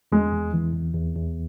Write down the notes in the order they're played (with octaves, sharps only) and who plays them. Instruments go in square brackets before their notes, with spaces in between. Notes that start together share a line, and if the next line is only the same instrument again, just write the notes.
[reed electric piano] E2 [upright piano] G#3
[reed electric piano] E2
E3
E2
E2
E2